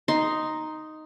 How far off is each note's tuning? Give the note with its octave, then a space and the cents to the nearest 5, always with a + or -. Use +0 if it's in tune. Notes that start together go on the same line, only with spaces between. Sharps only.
D#4 +0 C6 +0